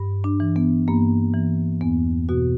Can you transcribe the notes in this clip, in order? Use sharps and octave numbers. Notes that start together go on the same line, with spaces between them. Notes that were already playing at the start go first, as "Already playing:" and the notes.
Already playing: G2
D4
E3
B3
G2 A#3
E3
E2 B3
B2 F#4